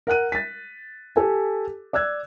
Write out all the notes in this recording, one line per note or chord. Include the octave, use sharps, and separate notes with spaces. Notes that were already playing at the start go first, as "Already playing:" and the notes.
A#4 F#5 F#6 D#7
A6 B6
G4 A4 G#5
D5 E6 F#6 G#6